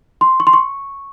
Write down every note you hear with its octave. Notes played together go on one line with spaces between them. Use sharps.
C6
C#6
C6
C#6